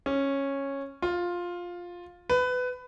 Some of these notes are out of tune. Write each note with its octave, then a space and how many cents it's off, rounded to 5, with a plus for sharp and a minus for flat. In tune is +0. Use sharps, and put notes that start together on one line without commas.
C#4 -10
F4 +10
B4 +20